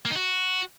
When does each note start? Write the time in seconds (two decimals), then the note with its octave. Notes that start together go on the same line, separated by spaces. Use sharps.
0.05 A#3
0.10 D#4
0.16 F#4